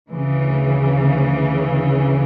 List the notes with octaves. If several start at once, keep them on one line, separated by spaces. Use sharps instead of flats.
D2 C#3 E3